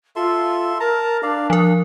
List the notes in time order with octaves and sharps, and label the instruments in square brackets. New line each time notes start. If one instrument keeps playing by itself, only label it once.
[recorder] F4 [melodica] A4 E5 C6
[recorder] A#4 [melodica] A5 A#5
[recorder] D4 [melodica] D5 F5
[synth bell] F3 A#4 [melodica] F5